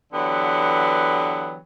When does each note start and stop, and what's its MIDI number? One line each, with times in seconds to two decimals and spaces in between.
0.13 1.57 50
0.13 1.57 52
0.13 1.57 54
0.13 1.57 59
0.13 1.57 67